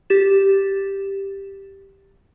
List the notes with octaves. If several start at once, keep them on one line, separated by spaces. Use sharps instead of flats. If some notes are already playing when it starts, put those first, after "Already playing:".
G4 A6 E7